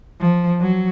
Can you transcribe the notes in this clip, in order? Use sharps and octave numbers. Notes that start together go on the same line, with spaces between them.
F3
F#3